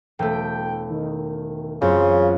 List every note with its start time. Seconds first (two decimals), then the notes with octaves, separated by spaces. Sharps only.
0.19 E1 A3 G5
0.90 D#3
1.82 F#2 C#3 C4 C#4 F4